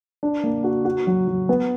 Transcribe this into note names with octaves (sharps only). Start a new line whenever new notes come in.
D4
A#3
F#4
F#4
F#3
F#3
B3